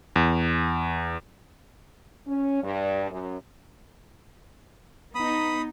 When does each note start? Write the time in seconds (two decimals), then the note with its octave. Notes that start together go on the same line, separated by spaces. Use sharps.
0.16 E2
2.27 C#4
2.63 G2
3.10 F#2
5.15 B3 D#4 B5 D#6